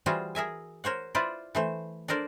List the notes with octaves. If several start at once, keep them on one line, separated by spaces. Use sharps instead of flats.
E3 G3 F4 F#4 G#4 C5
G#4 A#4 E5 G#5
A#4 C5 C#5 F#5
E4 F4 B4 C5 D5
E3 A3 C5
D4 A4 A#4 C5 D5